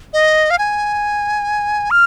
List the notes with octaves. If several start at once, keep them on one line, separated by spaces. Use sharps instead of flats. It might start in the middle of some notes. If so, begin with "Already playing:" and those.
D#5
F5
G#5
F6